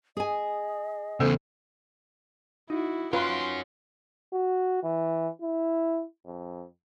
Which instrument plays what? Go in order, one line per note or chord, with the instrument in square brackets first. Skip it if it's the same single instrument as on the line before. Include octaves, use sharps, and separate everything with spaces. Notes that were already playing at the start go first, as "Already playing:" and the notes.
[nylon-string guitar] G#4 G#5 [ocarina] D#5
[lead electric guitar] E2 C#3 [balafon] B3 A4 C5
[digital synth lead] D#4 [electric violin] E4 F#4
[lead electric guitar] C#4 F#4 [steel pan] F4 B4 [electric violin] G5 C6
[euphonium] F#4
E3
E4
F2